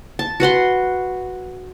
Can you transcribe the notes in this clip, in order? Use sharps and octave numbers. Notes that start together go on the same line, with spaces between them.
A5
F#4 B4 F#5 C6